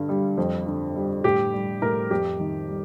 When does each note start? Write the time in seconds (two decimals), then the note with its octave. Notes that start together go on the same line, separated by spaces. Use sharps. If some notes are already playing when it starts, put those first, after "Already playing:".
Already playing: G2 D3
0.09 G3
0.37 F2
0.67 D3
0.96 G3
1.24 A2 G4
1.53 G3
1.82 A2 A#4
2.11 F2 G4
2.40 D#3
2.68 G3